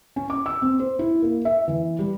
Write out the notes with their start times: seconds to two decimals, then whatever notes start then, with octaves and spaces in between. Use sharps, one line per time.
0.16 C#4
0.30 D6
0.46 E6
0.62 C4
0.80 C5
0.99 E4
1.22 A#3
1.45 E5
1.68 E3
1.99 G3